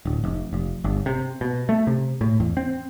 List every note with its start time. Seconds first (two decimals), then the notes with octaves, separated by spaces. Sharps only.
0.05 D1
0.24 F1
0.53 F1
0.84 G1
1.06 C3
1.41 B2
1.69 A3
1.87 C3
2.21 A2
2.40 E2
2.57 C4